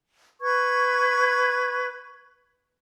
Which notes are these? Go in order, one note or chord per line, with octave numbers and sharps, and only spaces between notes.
B4 C#6 G#6